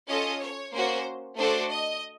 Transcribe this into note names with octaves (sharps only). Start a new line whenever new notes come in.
C#4 F4 A4 D#5
C#5
A#3 C#4 F#4 C5
A3 D4 F#4 A4 C5
D#5